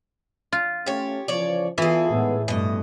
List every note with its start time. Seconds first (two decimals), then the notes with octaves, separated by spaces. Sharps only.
0.52 F4
0.86 A3 C#4 G4 C#5
1.28 C#3 E3 F3 C#5 D5
1.78 E3 B3 E4 F4 G#4 A4
2.11 A2 D#3 G#3 B3
2.48 G2 B2 A3 D#5